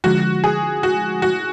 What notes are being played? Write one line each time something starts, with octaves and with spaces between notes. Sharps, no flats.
D3 F3 G#3 F#4
G#4
F#4
F#4